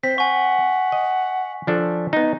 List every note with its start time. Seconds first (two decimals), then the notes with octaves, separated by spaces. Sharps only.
0.03 C4 C5 B6
0.18 F#5 G#5 C#6
0.92 D#5
1.67 F3 D4 A4
2.13 B3 D#4